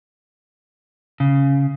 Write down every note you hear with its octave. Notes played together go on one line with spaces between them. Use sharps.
C#3